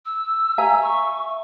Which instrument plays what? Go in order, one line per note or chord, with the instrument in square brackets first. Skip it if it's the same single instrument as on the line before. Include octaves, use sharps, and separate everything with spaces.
[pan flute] E6
[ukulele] E5 G#5 A#5
[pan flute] C#6